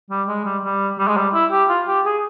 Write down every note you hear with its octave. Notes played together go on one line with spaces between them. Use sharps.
G3
G#3
G3
G3
G3
G#3
G3
E4
G4
F4
G4
G#4